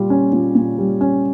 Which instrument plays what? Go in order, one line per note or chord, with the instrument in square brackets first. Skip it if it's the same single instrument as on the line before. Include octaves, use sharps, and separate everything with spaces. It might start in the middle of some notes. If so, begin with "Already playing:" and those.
Already playing: [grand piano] A#2 G3
C#4
A#2
A#2
G3
C#4